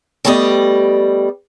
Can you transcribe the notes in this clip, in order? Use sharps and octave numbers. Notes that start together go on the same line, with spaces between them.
G3 A3 B3 G4 D5 D#5